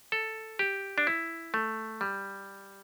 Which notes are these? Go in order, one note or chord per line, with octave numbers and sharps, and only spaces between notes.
A4
G4
D4
E4
A3
G3